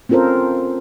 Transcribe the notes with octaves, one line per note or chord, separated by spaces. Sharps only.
C4 C#4 F4 A4 A#4 C5